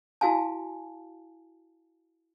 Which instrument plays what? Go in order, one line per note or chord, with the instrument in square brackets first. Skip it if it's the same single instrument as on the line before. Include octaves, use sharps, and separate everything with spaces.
[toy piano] E4 F#4 F5 G#5 A5